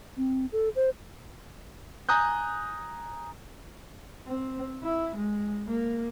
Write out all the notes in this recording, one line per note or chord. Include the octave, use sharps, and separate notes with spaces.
C4
A4
C5
G#5 A#5 D#6 F#6 G6
C4
E4
G#3
A#3